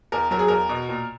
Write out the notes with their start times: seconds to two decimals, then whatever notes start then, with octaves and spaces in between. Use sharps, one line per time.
0.12 E2 A#4
0.31 F#3 A#4
0.39 G#4
0.48 E2 A#4
0.69 B2
0.89 A#2